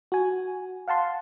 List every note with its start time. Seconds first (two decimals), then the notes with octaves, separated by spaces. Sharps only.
0.12 F#4 G#5
0.88 F5 F#5 A5 C6